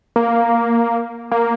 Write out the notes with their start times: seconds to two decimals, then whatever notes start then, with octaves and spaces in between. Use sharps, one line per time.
0.16 A#3
1.32 A#3